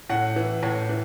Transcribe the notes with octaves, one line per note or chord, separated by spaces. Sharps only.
A2 F#5
E3
A2
E3